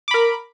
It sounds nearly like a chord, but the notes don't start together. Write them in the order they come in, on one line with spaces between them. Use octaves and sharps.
D6 B5 A#4